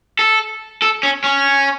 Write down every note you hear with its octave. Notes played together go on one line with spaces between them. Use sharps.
A4
A4
C#4
C#4